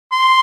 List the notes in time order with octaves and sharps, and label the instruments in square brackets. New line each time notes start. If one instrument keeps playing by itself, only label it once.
[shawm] C6